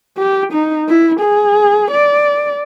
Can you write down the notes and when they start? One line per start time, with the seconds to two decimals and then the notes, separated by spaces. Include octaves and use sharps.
0.18 G4
0.52 D#4
0.88 E4
1.20 G#4
1.91 D5